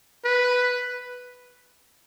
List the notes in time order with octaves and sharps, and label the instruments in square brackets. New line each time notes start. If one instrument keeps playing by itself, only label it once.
[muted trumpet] B4